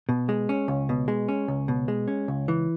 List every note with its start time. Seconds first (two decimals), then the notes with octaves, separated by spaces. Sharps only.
0.09 B2
0.29 G#3
0.49 C#4
0.68 C#2
0.89 B2
1.08 G#3
1.28 C#4
1.48 C#2
1.68 B2
1.88 G#3
2.08 C#4
2.28 C#2
2.48 E3